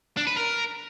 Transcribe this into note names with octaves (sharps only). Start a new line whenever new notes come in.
D4
B4
A#4